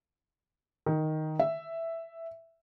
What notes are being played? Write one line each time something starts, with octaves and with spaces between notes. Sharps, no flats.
D#3
E5